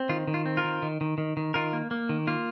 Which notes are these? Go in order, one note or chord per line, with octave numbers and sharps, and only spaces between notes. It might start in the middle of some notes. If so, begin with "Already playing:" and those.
Already playing: C4
D#3 F4
D#3
F4
C4
F4 A#4
D#3
D#3
D#3
D#3
D#3
D#3 F4 A#4
A#3
A#3
D#3
A#3 F4